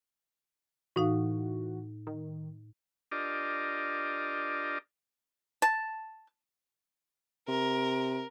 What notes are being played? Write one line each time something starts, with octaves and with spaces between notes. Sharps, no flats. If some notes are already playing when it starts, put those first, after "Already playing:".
A2 E3 D#4 F#4 F5
D#3
D4 F4 G4 A#4 D5 D#5
A5
C3 A#4